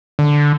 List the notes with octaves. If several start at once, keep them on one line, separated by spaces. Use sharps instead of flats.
D3